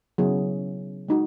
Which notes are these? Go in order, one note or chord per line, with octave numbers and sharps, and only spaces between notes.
C#3 F#3 B3 E4 G#4
G#3 D#4 F#4